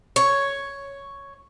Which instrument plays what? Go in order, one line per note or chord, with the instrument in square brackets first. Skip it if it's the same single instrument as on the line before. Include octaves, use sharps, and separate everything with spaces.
[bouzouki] C#5